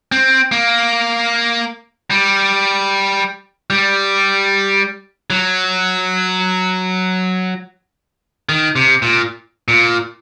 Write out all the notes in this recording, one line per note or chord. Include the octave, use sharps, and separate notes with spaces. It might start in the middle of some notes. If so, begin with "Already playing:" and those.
C4
A#3
G3
G3
F#3
D#3
C3
A#2
A#2